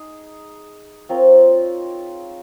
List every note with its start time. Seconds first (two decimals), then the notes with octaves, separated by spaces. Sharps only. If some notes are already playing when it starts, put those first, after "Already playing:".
Already playing: D#4 G#4
1.09 C4 F4 A#4 C#5